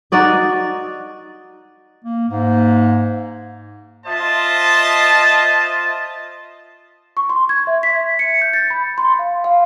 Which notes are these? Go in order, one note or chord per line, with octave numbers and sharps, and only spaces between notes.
D#4 F#4 D5 D#5
A#3
G#2 A#3
F4 C5 D#5 E5 A5
C#6
C6
G#6
E5
B6
C#7
G6
A6
B5
C6
F5
F5